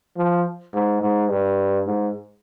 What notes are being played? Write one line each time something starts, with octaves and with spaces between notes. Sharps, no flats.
F3
G#2
G#2
G2
G#2